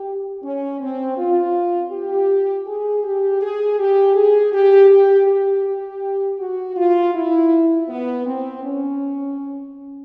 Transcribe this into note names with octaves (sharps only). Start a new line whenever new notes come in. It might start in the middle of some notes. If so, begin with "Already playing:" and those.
Already playing: G4
C#4
C4
F4
G4
G#4
G4
G#4
G4
G#4
G4
G4
G4
G4
F#4
F4
E4
B3
C4
C#4